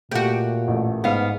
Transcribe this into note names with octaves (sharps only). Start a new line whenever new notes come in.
A#2 A3 F#4 G4
A1 A3
G#2 B3 F5